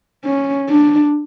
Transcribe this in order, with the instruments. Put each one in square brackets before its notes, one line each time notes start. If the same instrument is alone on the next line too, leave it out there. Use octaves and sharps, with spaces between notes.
[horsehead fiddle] C#4
D4